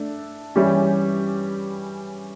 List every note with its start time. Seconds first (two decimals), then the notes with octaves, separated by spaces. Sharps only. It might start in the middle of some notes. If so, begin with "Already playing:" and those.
Already playing: A3 D4 A4
0.55 E3 G3 C#4 G4